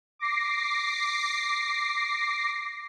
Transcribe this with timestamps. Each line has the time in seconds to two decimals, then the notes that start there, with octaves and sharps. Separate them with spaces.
0.19 D6 A#6 C7